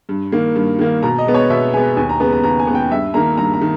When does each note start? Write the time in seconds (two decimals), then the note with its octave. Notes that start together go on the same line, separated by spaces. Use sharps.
0.09 G2
0.32 D#3 A#3
0.56 G2
0.79 D#3 A#3
1.03 B2 A#5
1.19 D#5
1.26 G#3 B3
1.34 C#5
1.50 B2 E5
1.74 G#3 B3 G#5
1.97 D#2 G#5
2.09 A#5
2.20 C#3 G#3 B3 A#5
2.32 A#5
2.43 D#2 A#5
2.59 G#5
2.67 C#3 G#3 B3
2.75 G5
2.91 G2 E5
3.14 D#3 A#3 A#5
3.37 G2 A#5
3.54 A#5
3.61 D#3